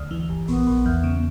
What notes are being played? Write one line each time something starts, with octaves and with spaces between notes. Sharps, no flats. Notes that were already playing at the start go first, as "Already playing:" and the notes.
Already playing: D2
E3
G1
A#1 B3
A#1
E2
C#3